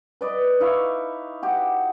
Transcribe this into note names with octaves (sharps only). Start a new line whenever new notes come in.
B4 D5 D#5
D#4 E4 F5 C#6
F#4 G4